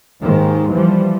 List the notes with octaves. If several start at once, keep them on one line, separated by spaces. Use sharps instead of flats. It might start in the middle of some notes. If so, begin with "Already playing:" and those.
D#2 G#2 D#3 G#3
E3 F3 G3